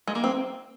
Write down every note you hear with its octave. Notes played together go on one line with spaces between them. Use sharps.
G#3
A#3
C4